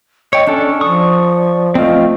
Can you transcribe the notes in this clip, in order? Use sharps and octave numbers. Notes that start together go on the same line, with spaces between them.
C#5 D#5 G5
C#4 D4 A4 D5
F3 C#6 D#6
A3 C4 F4 D#5